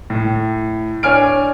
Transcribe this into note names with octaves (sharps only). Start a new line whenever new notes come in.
A2
D4 C#5 G#5 F6 D7